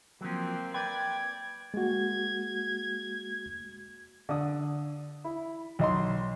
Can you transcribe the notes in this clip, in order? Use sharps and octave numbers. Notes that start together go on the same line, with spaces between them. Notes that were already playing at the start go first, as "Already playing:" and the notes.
F3 F#3 A#3 C4
B4 D5 G5 G#6
G#3 A#3 F#4 G#6
D3 D#6
E4
B1 D#5 C6